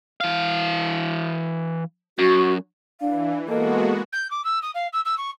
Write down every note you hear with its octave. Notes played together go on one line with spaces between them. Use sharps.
E3 F5
F#2 F#4
E3 D4 F5
G#3 A#3 B3 F#4 A4 D#5
G6
D6
E6
D#6
F5
E6
E6
C#6